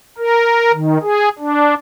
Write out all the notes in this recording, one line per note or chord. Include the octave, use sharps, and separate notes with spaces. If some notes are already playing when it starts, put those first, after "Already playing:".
A#4
D#3
G#4
D4